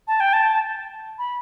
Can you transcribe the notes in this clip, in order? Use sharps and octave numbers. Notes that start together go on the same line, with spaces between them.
A5
G5
A5
B5